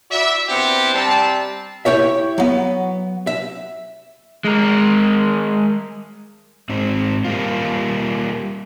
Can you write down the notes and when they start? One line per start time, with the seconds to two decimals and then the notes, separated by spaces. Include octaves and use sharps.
0.10 E4 F#4 D5 E5
0.49 B3 C4 D4 E4 G4
0.94 C3 G3 C4 A5
1.85 E4 G4 C#5 E5
2.38 F#3 B3
3.27 E5
4.45 G#3 A#4
6.69 G#2 C4
7.25 G3 A#3 F4